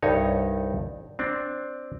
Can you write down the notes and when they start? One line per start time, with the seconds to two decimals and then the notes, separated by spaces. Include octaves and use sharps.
0.02 C2 G2 D#4 C#5
1.19 C4 D4